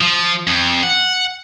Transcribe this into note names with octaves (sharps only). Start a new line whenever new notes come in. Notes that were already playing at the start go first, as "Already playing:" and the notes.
F3
F2
F#5